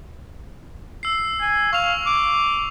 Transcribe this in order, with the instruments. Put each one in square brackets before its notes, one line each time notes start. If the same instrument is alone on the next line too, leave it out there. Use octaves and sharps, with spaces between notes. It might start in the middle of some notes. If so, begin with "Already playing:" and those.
[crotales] E6 C7
[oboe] G#5
[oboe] F5 [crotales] C#6 F7
[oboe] D6